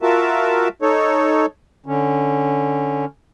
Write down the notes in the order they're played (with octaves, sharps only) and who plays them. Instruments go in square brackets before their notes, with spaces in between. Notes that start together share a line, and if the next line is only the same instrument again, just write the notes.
[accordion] F4 F#4 A#4 E5 A5
D#4 A4 C#5
[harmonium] D3 C#4